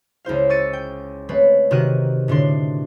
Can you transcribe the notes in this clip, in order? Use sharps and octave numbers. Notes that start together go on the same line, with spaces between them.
C#2 E4 C5 F5
C#6 E6 A6 C#7 D#7
G5
G#3 A3 C4 B4 C#5
C3 D#3 F#4 A#4 F#6 D#7
A2 D3 D4 C6